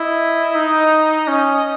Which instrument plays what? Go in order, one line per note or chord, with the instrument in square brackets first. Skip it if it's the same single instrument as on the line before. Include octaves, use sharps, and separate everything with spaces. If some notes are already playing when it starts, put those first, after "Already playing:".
Already playing: [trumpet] E4 [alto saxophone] D#5
[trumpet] D#4
C#4